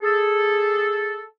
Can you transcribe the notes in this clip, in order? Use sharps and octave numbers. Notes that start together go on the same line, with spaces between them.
G#4 A4